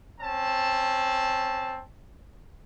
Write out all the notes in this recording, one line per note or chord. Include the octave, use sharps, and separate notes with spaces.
C4 C#4 A5